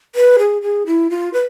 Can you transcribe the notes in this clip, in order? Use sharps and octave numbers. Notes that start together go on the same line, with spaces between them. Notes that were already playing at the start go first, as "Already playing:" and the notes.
B4
G#4
G#4
E4
F4
B4